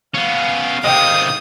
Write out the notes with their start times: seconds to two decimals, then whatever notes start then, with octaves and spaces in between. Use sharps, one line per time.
0.14 B3 C#4 F5
0.84 C3 D#3 D#5 G5 D#6